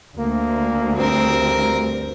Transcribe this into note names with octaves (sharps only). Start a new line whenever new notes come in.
D2 A#3
G2 C4 A#4